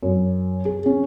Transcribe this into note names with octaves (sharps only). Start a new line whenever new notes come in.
F#2
G#4
C#4